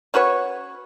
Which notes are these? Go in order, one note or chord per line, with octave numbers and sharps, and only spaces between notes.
C#4 F#4 B4 C#5